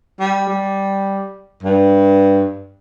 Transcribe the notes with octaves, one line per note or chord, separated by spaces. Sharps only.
G3
G3
G2